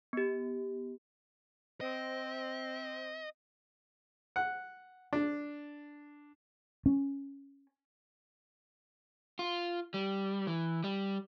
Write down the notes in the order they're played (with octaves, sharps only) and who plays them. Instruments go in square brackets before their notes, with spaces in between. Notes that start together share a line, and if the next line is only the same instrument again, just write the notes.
[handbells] B3 G4
[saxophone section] C4 [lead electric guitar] D#5
[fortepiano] F#5
D4
[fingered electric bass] C#4
[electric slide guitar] F4
G3
E3
G3